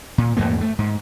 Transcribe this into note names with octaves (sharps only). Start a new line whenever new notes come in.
A#2
E2 G#2 A3 A#3
A3
G#2